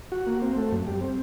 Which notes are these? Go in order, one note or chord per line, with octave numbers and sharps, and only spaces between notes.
F#4
A#3
C4
A3
F#2
G3
C4